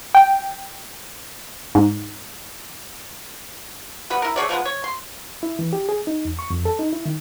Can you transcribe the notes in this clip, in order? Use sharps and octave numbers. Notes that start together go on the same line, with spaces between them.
G5
G#2
G3 B3 B5
E4 A#4
A3 G#4 C#5 D5
F3 G#3 A#3 B3
C#5
C6
E4
E3
G4
G#4
D#4
E2
C#6
F2
A4
D#4
E4
D#3